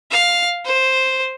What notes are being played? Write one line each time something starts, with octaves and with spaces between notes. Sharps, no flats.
F5
C5